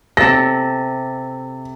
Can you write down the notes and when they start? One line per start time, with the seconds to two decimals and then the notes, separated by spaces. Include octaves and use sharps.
0.17 C3 A4 A#6